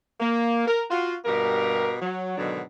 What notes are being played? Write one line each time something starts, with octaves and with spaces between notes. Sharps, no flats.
A#3
A#4
F4 F#4
G2 B2 A#3 G4 A#4
F#3
G#2 B2 D3 D#3 F#3 D4